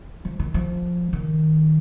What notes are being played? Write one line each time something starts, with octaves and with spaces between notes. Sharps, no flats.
F3
D#3
F3
D#3